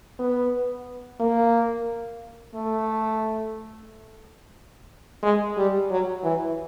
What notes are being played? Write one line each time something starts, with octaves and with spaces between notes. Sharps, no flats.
B3
A#3
A3
G#3
G3
F#3
E3